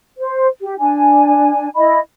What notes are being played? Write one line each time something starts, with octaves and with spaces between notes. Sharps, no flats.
C5
G4
D4 G#5
E4 D#5 B5